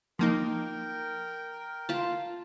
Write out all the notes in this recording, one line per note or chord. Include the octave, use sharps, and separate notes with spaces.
F3 A#3 D#4 A#4 G5
F4 A5